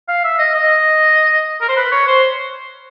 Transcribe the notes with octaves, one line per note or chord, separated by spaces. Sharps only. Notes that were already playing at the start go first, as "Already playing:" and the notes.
F5
E5
D#5
D#5
A#4
C5
B4
C#5
C5